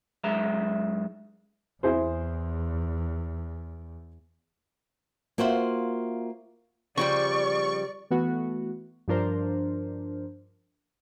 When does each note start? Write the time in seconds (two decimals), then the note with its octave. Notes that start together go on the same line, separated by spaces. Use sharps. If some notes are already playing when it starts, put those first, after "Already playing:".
0.24 F#2 G#3 E5 A#5
1.83 E2 E4 G#4 C5
5.38 A#3 F4 F#4 C5 E5 F#5
6.97 C#3 F3 G3 D5 C#6
8.11 E3 A3 B3 F#4
9.08 G2 F3 D4 A#4 C5